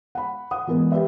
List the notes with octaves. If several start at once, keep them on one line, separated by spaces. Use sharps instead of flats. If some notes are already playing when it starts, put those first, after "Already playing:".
F#5 B5
F#5 D#6
E3 G#3 B3 A#4
G4 B4 D5 E5